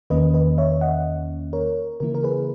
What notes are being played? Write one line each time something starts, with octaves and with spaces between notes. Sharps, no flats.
E2 D#3 A#3 C#4 B4 D#5
B4 D#5
C#5 E5
D#5 F#5
A#4 C#5
C#3 E3 A#3 E4 A#4
A#4
G#4 B4